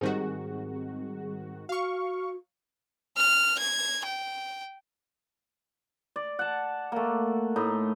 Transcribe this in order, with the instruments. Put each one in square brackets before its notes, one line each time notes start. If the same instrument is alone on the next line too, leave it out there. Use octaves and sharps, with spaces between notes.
[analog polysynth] G#2 D#3 F#4 [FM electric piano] G3 C4 G#4
[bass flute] F#4 [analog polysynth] F5 C#6
[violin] F6
G#6
G5
[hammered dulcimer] D5
F#5 A5
A3 A#3
A2 D#4